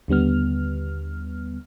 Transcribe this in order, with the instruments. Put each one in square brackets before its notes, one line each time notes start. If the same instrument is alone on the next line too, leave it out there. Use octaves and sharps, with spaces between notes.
[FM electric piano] D#2 D3 G3 B3 F6